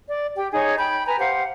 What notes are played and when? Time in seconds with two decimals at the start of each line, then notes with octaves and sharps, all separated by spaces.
0.09 D5
0.36 G4 G5
0.53 D#4 G#4 C#5 G#5
0.77 G5 B5 G6
1.05 B4 G#5 A#5
1.19 G4 C5 F5 F#5